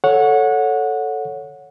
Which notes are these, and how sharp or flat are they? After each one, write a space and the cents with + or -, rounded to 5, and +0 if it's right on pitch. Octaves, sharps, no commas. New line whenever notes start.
A4 +0 C#5 +5 F#5 -20